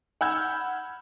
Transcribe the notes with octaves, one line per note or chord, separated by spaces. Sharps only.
F#5 B5 E6 F6 G6 G#6